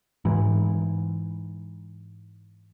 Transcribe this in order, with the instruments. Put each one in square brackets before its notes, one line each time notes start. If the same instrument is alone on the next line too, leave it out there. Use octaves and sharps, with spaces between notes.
[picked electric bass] G#2 E3